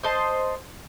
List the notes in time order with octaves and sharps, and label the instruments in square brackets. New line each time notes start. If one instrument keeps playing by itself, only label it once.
[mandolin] C5 D#5 A5